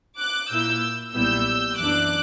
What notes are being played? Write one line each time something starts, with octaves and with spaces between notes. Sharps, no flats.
D6 F#6
A#2 A#3 E4 E6 G6
B1 A#2 G3 B3 E4 E6 G6
F#2 E3 B3 D4 D6 F#6